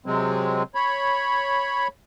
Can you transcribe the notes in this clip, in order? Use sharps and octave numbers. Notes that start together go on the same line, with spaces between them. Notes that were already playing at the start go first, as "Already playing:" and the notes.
C3 F#3 G#3 C4
C#5 B5